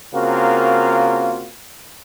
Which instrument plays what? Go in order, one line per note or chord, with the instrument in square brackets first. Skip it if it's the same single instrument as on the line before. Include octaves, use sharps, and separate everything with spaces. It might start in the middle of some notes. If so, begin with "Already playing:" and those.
[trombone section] C#3 A#3 C4 F4 F#4 A#4